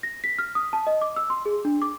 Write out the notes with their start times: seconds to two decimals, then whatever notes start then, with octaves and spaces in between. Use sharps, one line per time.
0.03 A#6
0.24 B6
0.38 F6
0.55 D#6
0.73 A5
0.87 D#5
1.02 D6
1.16 E6
1.30 C6
1.46 G#4
1.65 D4
1.82 D6